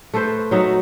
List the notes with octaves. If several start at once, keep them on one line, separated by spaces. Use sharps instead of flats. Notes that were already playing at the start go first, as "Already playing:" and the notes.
A3 A4 B4 C5
F#3 D#4 E5 F#5